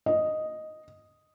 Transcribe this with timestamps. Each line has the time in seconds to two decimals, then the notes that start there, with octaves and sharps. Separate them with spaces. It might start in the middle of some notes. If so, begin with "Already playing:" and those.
0.06 D#5